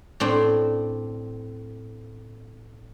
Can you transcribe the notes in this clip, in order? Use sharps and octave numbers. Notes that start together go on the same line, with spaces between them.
A2 C4 D4